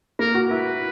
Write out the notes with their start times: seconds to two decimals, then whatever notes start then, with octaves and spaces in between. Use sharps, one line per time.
0.19 A#3 A#4
0.35 F#4
0.49 E4 B4